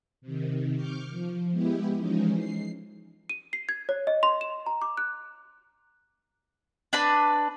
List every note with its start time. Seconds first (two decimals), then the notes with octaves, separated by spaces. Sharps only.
0.21 C3 D#3
0.74 C#6 D6 F6 G6
1.10 F3
1.51 G#3 B3 E4 G4
1.98 E3 F3 G#3 C#4 D#4
2.36 C7
3.29 D#7
3.53 C7
3.69 G#6
3.89 C#5
4.07 D#5
4.23 C6
4.41 E7
4.66 A#5
4.82 D6
4.97 F#6
6.93 D4 B4 A5